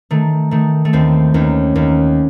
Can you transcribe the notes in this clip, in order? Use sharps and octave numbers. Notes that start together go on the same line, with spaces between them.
D#3 A3
D#3 A3
A3
D#2 C4
D#2 C#4
D#2 C#4